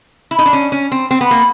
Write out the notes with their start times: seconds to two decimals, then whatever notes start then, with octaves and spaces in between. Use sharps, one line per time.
0.31 E4
0.39 D#4
0.46 D4
0.53 C#4
0.72 C#4
0.92 C4
1.11 C4
1.21 B3
1.31 A#3